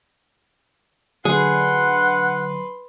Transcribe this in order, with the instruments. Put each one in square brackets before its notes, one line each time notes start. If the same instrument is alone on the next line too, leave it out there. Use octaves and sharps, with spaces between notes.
[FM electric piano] D3 F#3 D4 [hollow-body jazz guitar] G#4 [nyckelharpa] B4 C6 [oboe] F#5